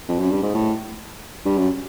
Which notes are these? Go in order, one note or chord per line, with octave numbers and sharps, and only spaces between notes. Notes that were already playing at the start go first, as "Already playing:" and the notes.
F2
F#2
G2
G#2
A2
G2
F#2